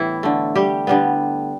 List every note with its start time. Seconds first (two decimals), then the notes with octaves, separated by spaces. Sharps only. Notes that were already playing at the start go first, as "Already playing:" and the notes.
Already playing: A2 E3 G3 B3 E4
0.23 D3 A3
0.55 G3 G4
0.87 D3 G3 B3